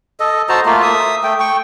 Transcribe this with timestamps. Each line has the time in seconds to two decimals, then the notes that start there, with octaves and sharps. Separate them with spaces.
0.20 A4 D#5
0.49 F#4 C5 A5 A#5
0.66 A3 A#3 F4
0.82 E5 D#6
1.24 A3 G5
1.40 G5 C#6